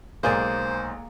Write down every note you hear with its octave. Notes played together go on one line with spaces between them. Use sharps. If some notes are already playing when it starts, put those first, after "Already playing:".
B1 G#3 A#3 G#4 C5 D5